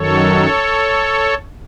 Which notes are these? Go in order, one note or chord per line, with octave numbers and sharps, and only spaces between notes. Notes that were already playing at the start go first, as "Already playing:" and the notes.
Already playing: F#2 D#3 F#3 A4 C#5